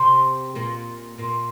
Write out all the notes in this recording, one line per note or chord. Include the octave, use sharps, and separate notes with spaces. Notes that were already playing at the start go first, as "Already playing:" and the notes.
Already playing: C3 C4
A#2 A#3
A#2 A#3